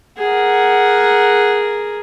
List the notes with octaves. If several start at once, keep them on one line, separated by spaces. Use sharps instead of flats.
G#4 A#4 F#5